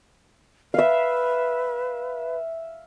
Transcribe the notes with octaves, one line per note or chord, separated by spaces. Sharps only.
B4 E5 F5